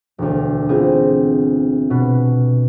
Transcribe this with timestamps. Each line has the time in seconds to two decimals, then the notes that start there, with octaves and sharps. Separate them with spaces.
0.18 E1 D2
0.69 B3 C4 E4 F4 G#4
1.90 B2 B4